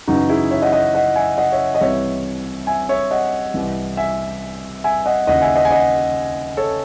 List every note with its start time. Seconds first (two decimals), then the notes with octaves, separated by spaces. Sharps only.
0.07 F#2 C#3 E3 D#4 F#4
0.29 E4 G#4
0.51 C#5 E5
0.62 D#5 F#5
0.73 D#5 F#5
0.94 D#5 F#5
1.16 E5 G#5
1.38 D#5 F#5
1.52 C#5 E5
1.75 D#5
1.81 C2 C3 E3 C#5 E5
2.67 E5 G#5
2.89 C#5 E5
3.11 D#5 F#5
3.54 C2 C3 E3
3.97 E5 G#5
4.84 E5 G#5
5.06 D#5 F#5
5.27 D#2 C#3 E3 D#5 F#5
5.42 E5 G#5
5.56 D#5 F#5
5.65 G#5
5.71 D#5 F#5
6.57 A4 C#5